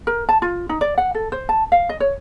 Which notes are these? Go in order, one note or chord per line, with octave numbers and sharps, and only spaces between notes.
A#4
A5
F4
D#4
D5
F#5
A4
C5
A5
F5
D#5
C#5